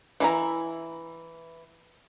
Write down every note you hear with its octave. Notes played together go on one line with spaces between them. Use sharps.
E3 E4 A#5